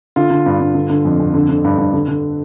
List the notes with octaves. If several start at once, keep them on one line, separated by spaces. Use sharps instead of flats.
D3 F4
D3
G2
G2
D3
D3
F2
F2
D3
D3
G2
G2
D3
D3